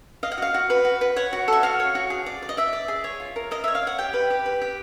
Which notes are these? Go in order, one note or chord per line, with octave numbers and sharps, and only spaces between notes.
D#5 F5
F#5
F#4 F5
F#4
B4
F#4
B4
C#5 F#5
F#4
A4 E5
F#4 F5
C#5
F#4
G#4
D5
D5
D#5
D5 E5
D5
G#4
C#5
F4
A#4
A#4 D#5
C#5 E5
F5
C#5 F#5
G4 G5
B4
G4
B4
G4